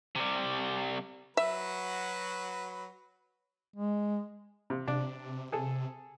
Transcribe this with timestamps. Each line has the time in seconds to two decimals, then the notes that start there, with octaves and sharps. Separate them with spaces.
0.15 C3 G3
1.37 F#3 F#4 B4 E5
3.76 G#3
4.70 C3
4.88 C3 D4
5.52 G#4 A4